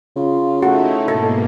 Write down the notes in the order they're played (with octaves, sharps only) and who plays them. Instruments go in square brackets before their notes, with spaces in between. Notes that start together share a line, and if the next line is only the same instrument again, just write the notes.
[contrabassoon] C#3 [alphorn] F4
[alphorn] A3 [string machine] D#4 E4 [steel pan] F#4
[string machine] G#2 B2 A#3 [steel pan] A4